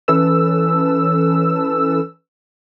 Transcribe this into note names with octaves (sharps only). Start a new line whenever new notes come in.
E3 C#4 A4 B4 E6